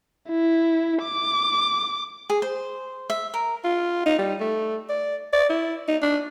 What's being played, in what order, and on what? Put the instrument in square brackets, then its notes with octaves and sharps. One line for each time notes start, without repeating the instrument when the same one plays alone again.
[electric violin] E4
D6
[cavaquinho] G#4
C5
E5
A#4
[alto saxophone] F4
D#4
G3
A3
D5
D5
E4
D#4
D4